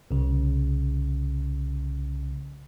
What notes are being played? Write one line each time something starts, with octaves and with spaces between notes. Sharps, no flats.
C2 C#3